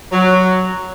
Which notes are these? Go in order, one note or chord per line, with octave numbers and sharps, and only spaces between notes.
F#3